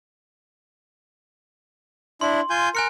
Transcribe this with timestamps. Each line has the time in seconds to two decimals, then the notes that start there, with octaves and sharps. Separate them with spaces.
2.21 D4 E4 C6
2.50 F4 G#5 G6
2.75 A#4 G#5 F#6 C#7